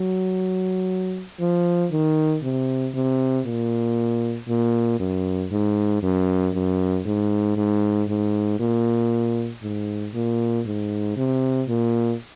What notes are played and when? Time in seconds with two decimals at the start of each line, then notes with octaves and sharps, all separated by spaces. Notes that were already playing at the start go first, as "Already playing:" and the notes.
Already playing: F#3
1.40 F3
1.91 D#3
2.43 C3
2.94 C3
3.46 A#2
4.49 A#2
5.00 F#2
5.51 G#2
6.03 F#2
6.54 F#2
7.06 G#2
7.57 G#2
8.08 G#2
8.60 A#2
9.63 G#2
10.14 A#2
10.66 G#2
11.17 C3
11.68 A#2